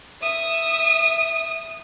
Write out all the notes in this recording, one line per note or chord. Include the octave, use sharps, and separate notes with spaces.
E5 D#6